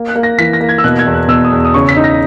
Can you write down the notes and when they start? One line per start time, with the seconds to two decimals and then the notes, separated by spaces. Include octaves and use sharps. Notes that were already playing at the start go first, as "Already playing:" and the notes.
Already playing: A#3
0.08 F#6
0.15 A#3
0.23 A#6
0.38 E3 B6
0.53 A#6
0.60 A#3
0.69 G#6
0.78 E6
0.84 B2 F#6
0.99 G#6
1.06 E2
1.14 F#6
1.28 B2 E6
1.44 D#6
1.52 E2
1.65 D#6
1.74 C#3 C#6
1.89 B6
1.97 D#4
2.04 A#6